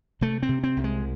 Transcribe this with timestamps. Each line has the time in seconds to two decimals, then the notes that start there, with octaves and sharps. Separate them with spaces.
0.21 C3 A3
0.43 C4
0.49 C3
0.64 C4
0.77 C2
0.84 G#3